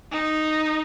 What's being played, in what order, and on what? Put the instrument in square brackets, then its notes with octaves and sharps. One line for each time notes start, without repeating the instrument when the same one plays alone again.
[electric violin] D#4